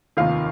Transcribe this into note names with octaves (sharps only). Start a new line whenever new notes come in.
F1 D#2 D#3 F4 F5